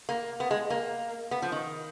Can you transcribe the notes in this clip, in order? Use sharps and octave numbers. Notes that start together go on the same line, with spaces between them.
A#3
B3
G#3
A#3
B3
F3
D#3